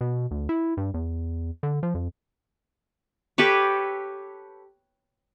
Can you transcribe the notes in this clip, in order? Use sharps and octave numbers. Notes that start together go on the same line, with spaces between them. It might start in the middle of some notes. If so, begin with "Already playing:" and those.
B2
D2
E4
G2
E2
D3
F3
F2
G4 A4 B4 C#5